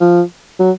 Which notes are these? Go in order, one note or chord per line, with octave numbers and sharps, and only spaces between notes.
F3
F#3